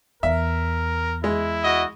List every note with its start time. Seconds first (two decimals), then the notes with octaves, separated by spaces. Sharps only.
0.23 E2 A#4 E5
1.24 G#3 E4
1.64 F#4 D#5